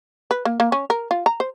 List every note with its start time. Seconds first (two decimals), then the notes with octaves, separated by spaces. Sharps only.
0.31 B4
0.45 A#3
0.60 A#3
0.72 C#4
0.90 A#4
1.11 F4
1.26 A#5
1.40 C5